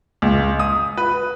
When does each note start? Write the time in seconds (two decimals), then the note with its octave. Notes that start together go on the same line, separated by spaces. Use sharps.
0.22 C#2
0.59 D#6
0.97 B4